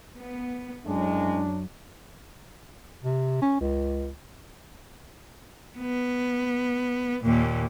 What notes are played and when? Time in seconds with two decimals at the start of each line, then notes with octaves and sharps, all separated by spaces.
0.15 B3
0.85 F#2 A2 G#3 D4
3.03 C3
3.42 C#4
3.60 C#2
5.78 B3
7.24 D#2 A#2